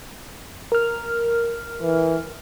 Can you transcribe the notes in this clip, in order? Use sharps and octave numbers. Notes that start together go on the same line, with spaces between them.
A#4 F6
E3